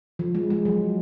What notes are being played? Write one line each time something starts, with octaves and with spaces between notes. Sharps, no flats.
F3
G#3
G#3
F#3